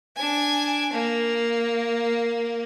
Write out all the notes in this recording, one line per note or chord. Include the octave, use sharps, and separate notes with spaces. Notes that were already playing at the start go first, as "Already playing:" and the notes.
D4 G#5
A#3